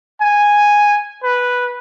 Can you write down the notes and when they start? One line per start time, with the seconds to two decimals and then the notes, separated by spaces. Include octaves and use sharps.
0.21 G#5
1.24 B4